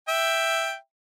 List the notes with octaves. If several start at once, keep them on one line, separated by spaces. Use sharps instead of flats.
E5 G5